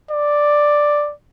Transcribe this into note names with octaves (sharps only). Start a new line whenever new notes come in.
D5